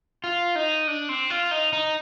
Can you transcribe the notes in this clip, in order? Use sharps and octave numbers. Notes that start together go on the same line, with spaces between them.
F4
D#4
D4
C4
F4
D#4
D#4